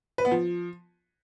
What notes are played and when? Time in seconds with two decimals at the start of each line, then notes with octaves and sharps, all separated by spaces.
0.18 B4
0.25 B3
0.31 F3